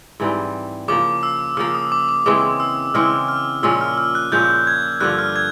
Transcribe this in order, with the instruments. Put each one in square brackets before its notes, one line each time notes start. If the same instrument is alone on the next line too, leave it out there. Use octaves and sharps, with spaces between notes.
[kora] G#2 E3 G3 C4
[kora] C#3 F3 A#3 [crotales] D6
[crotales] E6
[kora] C#3 F3 A#3 [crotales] E6
[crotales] D#6
D6
D6
[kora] C#3 E3 G#3 C4 [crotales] D6
[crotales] E6
[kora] C#3 E3 G#3 C4 [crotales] F6
[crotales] F6
[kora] A#2 F3 G#3 C#4 [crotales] E6
[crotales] F6
F6
F#6
[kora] A#2 F3 G#3 C#4 [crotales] G6
[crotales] G#6
[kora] G2 D3 F3 [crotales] F#6
[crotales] F6
G#6